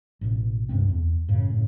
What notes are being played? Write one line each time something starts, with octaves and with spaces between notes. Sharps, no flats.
A1 B2
C#2 G2 C3 C4
E2
F#2 A2 C#3
A2 C#3